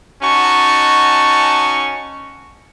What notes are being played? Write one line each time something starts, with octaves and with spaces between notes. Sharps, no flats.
C#4 D#4 F#4 A5 C#6